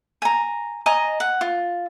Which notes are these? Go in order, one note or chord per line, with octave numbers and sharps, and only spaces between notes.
G#5 A#5
D#5 G#5 A#5
F#5
F4